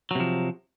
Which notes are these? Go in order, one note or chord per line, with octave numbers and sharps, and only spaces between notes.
C3 F3 F#3